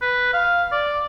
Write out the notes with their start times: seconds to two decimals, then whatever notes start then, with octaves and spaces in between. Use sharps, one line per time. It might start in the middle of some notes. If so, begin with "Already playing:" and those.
0.02 B4
0.33 F5
0.72 D5